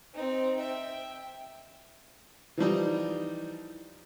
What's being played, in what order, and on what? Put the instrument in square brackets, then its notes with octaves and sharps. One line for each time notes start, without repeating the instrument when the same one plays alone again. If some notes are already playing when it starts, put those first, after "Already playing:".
[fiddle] C4 D#4
E5 G5
[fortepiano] E3 F3 G3 D#4